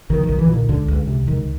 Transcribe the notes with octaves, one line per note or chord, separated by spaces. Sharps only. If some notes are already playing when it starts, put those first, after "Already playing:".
B1 D#3
D#3
B1
E3
A#2
D#3
C#2 D3
C#2
C3
C#2 D#3